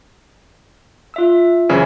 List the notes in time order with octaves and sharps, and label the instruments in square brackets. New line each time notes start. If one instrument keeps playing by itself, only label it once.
[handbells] F4 E5 E6
[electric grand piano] F#2 C#3 E3 [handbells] C5 C#5